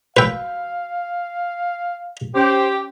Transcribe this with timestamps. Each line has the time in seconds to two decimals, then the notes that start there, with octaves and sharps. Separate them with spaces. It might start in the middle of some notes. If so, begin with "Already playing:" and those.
0.17 F#4 B4 F5 G5 E6
2.35 C#4 G4 C5 C#5 C6